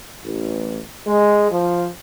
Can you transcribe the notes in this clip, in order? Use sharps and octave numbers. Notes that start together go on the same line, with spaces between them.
A1
G#3
F3